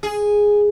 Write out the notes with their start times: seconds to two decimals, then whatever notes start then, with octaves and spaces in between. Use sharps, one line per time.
0.03 G#4